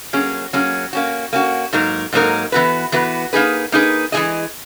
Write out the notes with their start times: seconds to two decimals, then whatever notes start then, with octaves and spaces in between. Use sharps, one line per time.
0.13 F#3 A#3 C#4 G#4
0.53 F#3 A#3 C#4 G#4
0.93 A#3 C#4 F#4
1.33 A#3 C#4 F#4
1.73 G#2 F#3 A#3 D#4 A#4
2.13 G#2 F#3 A#3 D#4 A#4
2.52 E3 B3 F#4 B4
2.92 E3 B3 F#4 B4
3.33 A#3 D#4 G#4 B4
3.72 A#3 D#4 G#4 B4
4.12 E3 G#3 D#4 G#4 D#5